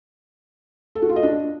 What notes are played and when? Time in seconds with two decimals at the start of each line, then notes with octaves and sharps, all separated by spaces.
0.95 A4
1.02 F#4
1.09 F4
1.16 D#5
1.23 D4